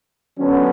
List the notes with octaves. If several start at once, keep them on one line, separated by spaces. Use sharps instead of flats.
D3 F#3 B3 C#4